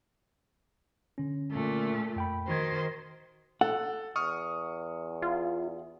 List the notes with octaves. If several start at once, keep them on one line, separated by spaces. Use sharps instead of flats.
D3 C#4
A#2 A3
F2 G5 B5
D#3 F#4 C5 G#6
A4 F#5
E2 C#6 D#6 F6
F4